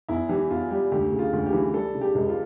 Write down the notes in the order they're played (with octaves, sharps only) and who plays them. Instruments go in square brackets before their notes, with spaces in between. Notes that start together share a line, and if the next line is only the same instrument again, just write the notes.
[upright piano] E2 E4
E3 G4
E2 F4
G3 G4
D2 G4
C#3
F4
D2
G4
E3
G3 A4
C#3
G4
C#2
F4